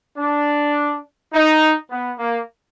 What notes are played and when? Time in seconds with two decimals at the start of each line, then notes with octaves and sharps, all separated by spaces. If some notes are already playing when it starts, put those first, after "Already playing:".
0.17 D4
1.32 D#4
1.90 B3
2.19 A#3